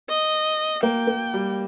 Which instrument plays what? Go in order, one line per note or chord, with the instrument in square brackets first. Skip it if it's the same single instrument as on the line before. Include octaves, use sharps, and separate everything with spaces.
[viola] D#5
[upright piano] A#3 [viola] G5
[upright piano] A#3
G3